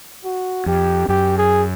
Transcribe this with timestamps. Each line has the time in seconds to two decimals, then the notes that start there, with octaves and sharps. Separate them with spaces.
0.25 F#4
0.66 F2 G4
1.08 F#2 G4
1.38 G#4